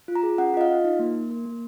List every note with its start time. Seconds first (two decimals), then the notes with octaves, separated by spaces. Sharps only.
0.08 F4
0.15 A#5
0.23 G#4
0.38 C#4 F#5
0.54 F4 D#5
0.61 F5
0.69 F4
0.84 D#4
0.99 A#3
1.15 A#3
1.30 A#3
1.46 A#3